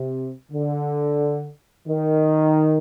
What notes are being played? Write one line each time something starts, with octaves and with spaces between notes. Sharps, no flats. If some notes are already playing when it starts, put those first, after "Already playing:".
Already playing: C3
D3
D#3